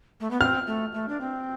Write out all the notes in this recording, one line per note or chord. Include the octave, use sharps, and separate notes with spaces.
A3
B3
C4 F6
A3
A3
D4
C4